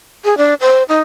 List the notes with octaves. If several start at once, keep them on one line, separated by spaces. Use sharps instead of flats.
G#4
D4
C5
D#4